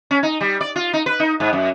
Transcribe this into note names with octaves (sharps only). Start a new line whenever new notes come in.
C#4
D#4
G3
D5
F4
D#4
B4
D#4
G#2
F#2